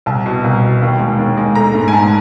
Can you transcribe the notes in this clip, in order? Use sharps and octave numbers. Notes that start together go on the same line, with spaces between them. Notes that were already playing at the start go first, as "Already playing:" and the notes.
C2 A5
B2
C2
B2
D#2
G#3
D#2
G#3
A3 A#5
G#2
G#5
G#2 A5